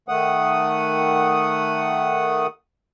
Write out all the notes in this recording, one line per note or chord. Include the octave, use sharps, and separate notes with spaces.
D#3 A3 F#5 D#6